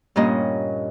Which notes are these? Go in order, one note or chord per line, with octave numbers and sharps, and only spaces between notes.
G2 A#2 A#3 C#4 D#5